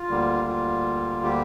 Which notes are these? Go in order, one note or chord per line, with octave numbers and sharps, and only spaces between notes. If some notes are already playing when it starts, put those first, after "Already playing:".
Already playing: F4
D2 D3 G3 A#3
F4
G4